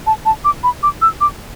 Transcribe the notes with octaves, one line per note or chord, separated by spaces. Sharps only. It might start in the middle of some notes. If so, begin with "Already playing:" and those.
A5
A5
D6
B5
D6
E6
D6